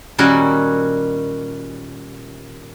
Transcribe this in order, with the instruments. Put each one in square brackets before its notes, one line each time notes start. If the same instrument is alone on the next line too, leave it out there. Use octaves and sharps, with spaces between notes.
[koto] A#2 D#3 G3 C#4 F#4